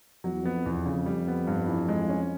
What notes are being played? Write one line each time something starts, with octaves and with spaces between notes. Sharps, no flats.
F2 F#3
E2
F2 B3
E2
C#3
G3
B3
G2
E3
G#3
C#4